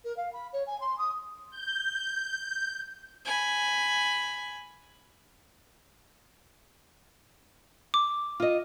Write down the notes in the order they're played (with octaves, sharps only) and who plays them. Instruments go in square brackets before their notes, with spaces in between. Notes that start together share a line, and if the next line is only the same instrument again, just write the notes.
[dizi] A#4
F5
B5
C#5
G#5
C6
D#6
[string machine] G6
[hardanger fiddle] G#5 B5
[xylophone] D6
[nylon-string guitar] F4 D#5